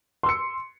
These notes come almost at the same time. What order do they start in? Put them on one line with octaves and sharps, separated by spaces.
C6 E6 C#7